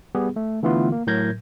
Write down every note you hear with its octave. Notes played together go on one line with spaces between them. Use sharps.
G3 B3 G4 G#4
A3
D3 E3 A3 B3 E4 F4
A#3
A2 F#3 A#4 G6 G#6 A#6